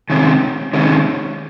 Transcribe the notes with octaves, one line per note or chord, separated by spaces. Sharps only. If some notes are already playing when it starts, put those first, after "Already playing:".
C3 D#3 G#3 C#4
C3 D#3 G#3 C#4